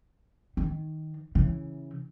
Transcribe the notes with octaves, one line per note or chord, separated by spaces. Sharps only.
D#3
C#3 E3